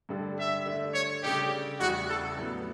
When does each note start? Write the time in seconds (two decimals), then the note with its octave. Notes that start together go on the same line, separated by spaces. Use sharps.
0.09 G2 D3 G3 D4 A4
0.38 E5
0.66 D3 A3 D4
0.94 C#5
1.23 C#3 G3 D4 G4 A4
1.80 E2 C#3 E3 G3 F#4
2.08 A4
2.37 A2 F#3 B3